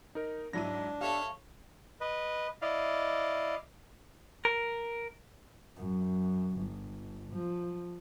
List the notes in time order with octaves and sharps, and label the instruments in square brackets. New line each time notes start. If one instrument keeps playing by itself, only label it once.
[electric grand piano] D#4 A#4
[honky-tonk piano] G#2 F#3 E4 [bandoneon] D4 [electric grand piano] A#6 D#7
[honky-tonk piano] G4 E5 [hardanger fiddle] A4 C#5 [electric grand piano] F5
[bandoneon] B4 D#5
E4 D5 D#5 F5
[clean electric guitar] A#4
[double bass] F#2
G1
F3